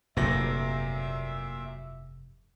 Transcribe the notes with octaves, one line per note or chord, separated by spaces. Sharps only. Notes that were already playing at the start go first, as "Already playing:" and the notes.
F1 G2 A#2 F#3 E5 A#6